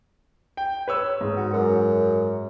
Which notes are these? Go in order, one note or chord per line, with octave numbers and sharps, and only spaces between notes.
G5
B4 C#5 E6
G#2
F#4
F#2